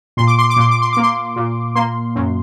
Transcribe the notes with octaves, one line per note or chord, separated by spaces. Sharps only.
A#2 C6
D6
C6
D6
A#2 C6
D6
C6
A#3 D6
C6
A#2
A#3 C6
F#2